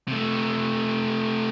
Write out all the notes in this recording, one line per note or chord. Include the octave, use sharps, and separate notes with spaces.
C3 A3